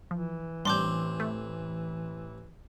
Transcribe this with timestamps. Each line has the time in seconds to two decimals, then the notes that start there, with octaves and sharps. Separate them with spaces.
0.11 E3 F3
0.65 A1 G3 C4 D4 C6 D6 G6
1.20 A3